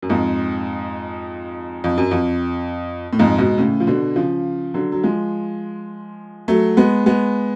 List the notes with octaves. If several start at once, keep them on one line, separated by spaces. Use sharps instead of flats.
F#2
F2 G#2
F2
F#2
F2
A2
F2 G#2
G#2 B2
A2 C#3
F3
B2 D3
C#3 F3
D3 F#3
F#3
F3 G#3
F#3 A3
G#3 B3
G#3 B3